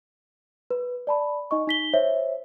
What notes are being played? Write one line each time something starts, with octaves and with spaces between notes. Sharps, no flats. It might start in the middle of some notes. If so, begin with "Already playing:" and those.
B4
D5 A5 B5
D#4 D#5 C#6
D#4 B6 G7
C5 C#5 E5